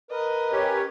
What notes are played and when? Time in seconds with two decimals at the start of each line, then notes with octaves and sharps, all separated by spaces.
0.11 A#4 B4 D#5
0.52 C#4 G4 C#5